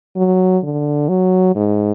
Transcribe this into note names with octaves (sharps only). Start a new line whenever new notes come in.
F#3
D3
F#3
G#2